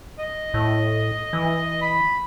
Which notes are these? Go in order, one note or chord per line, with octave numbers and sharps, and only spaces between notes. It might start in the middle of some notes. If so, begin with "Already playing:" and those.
D#5
A2
E3
B5